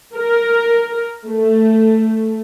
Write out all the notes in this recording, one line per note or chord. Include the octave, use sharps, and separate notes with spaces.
A#4
A3